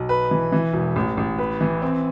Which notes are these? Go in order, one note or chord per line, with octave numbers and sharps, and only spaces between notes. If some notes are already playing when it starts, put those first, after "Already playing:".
Already playing: B1
B4
E3
E3
E1
A1
A1
B4
E3
C4